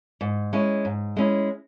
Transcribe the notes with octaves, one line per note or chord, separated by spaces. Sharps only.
G#2
G#3 C#4 E4
G#2
G#3 C#4 E4